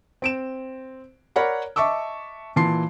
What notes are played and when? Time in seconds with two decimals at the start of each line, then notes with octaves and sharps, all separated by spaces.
0.22 C4 D7 E7
1.36 A#4 C#5 D5 F#5 B5
1.76 D#5 E5 A5 C#6 D6 E6
2.56 A#2 E3 A5 C6 C7